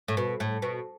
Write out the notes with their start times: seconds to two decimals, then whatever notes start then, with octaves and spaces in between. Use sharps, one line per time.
0.08 A2
0.17 B2
0.40 A2
0.62 B2